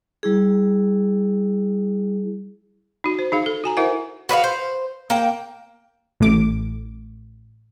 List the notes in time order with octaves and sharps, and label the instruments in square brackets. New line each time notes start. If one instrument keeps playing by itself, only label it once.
[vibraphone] G3 E4 G#4
[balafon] D#4 F#4
C5
D#4 G#4 F5
A4
F#4 G#5 A#5
E4 A#4 C5 E5 F#5
[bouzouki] F#4 B4 D5 F5
C5
A#3 G5
[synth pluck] A1 A2 D6